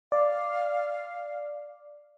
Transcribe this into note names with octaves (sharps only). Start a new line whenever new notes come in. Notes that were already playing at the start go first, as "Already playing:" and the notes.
D5 F5